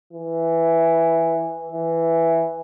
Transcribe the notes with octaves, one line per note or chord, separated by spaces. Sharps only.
E3
E3